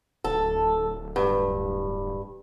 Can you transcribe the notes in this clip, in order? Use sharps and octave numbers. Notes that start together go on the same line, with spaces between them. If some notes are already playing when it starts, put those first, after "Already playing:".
D1 A4
G2